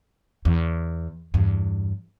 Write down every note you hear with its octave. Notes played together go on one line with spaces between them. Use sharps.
E2
E2 G2